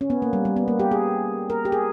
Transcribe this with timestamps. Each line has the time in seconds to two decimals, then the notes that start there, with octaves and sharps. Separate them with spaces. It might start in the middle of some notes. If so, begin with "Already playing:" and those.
0.01 C#4
0.10 B3
0.22 A#3
0.33 G3
0.45 G3
0.56 B3
0.68 A#3
0.80 G4
0.91 G#4
1.50 A#4
1.65 G4
1.72 G#4